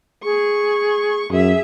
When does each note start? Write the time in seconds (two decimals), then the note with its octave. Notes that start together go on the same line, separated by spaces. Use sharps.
0.24 G#4 C#6
1.30 F#2 G#4 E5